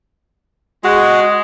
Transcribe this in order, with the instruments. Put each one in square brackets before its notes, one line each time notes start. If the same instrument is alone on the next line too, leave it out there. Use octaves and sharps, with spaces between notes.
[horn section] G#3 [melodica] F#4